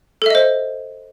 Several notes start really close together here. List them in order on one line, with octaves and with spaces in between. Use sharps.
A4 E5 D#5 C5